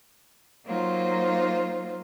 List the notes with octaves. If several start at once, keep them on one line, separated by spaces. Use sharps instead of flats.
F#3 A#3 D#4 F4 C5